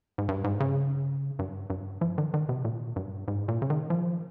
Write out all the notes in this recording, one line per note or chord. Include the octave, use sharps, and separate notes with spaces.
G#2
G2
G#2
C#3
G2
G2
F3
D#3
D#3
C3
A#2
G2
G#2
A#2
C#3
D#3
F3